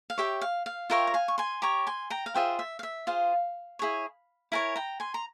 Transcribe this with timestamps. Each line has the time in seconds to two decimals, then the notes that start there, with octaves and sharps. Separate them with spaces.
0.10 F5
0.18 G4 C#5 E5 G5
0.41 F5
0.66 F5
0.90 F4 A#4 C#5 E5 G5
1.07 A#5
1.14 F5 G#5
1.28 C#6
1.38 G#5 C6
1.62 G4 C#5 A#5 C#6
1.87 G#5 C6
2.10 G5 A#5
2.26 F5
2.34 F4 G#4 C5 E5 G5
2.59 E5
2.79 F5
2.83 E5
3.07 F4 G#4 C5 F5
3.79 E4 G#4 C#5
4.52 E4 A#4 C#5 F5 G#5
4.76 G5 A#5
5.00 G#5 C6
5.14 A#5